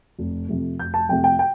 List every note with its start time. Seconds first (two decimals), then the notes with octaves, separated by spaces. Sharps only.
0.19 F1
0.49 F2 C3 A3
0.79 F1 G6
0.94 A5
1.09 F2 C3 A3 G5
1.24 G5
1.39 G5